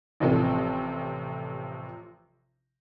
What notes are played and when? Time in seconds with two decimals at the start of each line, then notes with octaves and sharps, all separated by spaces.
0.20 A1 C3 F3 A4